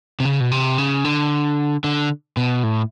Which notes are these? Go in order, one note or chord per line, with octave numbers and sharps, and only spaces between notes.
C3
C#3
B2
C3
C#3
D3
D3
B2
A2